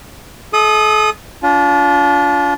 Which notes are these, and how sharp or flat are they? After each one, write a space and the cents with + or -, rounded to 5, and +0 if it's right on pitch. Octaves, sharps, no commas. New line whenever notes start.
A4 -40 E5 -45 D#6 -10
D4 -35 F4 +10